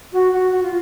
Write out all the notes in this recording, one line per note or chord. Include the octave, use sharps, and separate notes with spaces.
F#4
F#4
F#4
F4